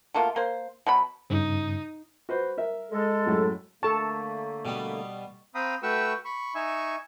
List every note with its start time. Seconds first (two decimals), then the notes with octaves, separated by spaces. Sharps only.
0.14 B2 A3 A#3 F4
0.36 A#3 C5
0.87 B2 F#3 B5
1.30 G2 C#3 D#4
2.29 F#4 B4 C5
2.58 A#4 E5
2.92 G#3 A4
3.26 F#2 A2 F#3
3.83 D3 A3 A#3 A4 A5 C#6 A6
4.65 B2 G3 B3
5.55 C4 F5 G5 A#5 B5 D#6
5.83 A3 F#4 B4 G5 C#6 E6
6.25 B5 C#6
6.55 D#4 E5 G#5 C#6